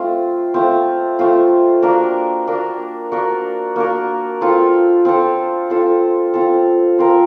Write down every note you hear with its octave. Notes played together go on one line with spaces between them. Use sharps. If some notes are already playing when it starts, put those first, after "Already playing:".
Already playing: A3 C4 F4
A3 C4 F4
A3 C4 F4
A#3 D4 F#4 A#4
A#3 D4 F#4 A#4
A#3 D4 F#4 A#4
A#3 D4 F#4 A#4
C4 F4 A4
C4 F4 A4
C4 F4 A4
C4 F4 A4
C4 F4 A#4